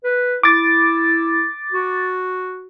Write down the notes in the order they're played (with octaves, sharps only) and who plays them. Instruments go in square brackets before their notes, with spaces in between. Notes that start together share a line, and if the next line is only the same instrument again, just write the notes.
[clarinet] B4
[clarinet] E4 [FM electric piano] D6 A6
[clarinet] F#4